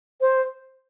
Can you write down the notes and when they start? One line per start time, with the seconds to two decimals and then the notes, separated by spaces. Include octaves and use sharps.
0.21 C5